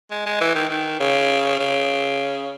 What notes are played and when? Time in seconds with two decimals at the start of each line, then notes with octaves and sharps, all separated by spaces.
0.11 G#3
0.26 G#3
0.41 E3
0.55 D#3
0.70 D#3
1.00 C#3
1.59 C#3